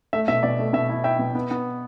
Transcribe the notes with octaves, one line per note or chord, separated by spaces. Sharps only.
A3 E5
B2 E5
B2 D5
A3
B2 E5
E4
E4 E5 G5
B2
B3
B3